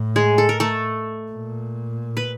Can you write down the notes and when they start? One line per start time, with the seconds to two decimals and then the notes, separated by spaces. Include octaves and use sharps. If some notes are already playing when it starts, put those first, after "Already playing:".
Already playing: A2
0.16 G#3 G#4
0.38 A4
0.49 A#4
0.60 A3 A4
1.32 A#2
2.17 B4